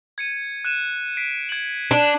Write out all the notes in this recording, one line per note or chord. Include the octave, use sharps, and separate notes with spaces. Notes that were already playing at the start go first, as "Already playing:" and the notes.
G#6 C#7 D#7
F#6 D#7 E7
B6 C7 D7
G#6 F#7
D4